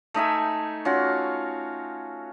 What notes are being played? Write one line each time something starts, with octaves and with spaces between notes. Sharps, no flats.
A3 D#4 E5 G#5
C#4 F4 F#4